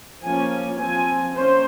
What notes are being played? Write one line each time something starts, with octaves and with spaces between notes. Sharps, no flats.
F3 A#3 C#4 G#5
F3 C4 G#5
A#3 C#4 C5